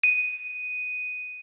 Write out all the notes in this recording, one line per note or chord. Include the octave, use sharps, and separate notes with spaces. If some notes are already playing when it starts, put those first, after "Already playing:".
D#7